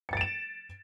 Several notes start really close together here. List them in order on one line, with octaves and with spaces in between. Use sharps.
C#7 A6 D7 E7